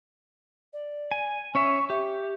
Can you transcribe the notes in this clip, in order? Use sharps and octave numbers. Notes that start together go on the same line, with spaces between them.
D5
G#5
C#4 C#5 E5 C#6
G4 E5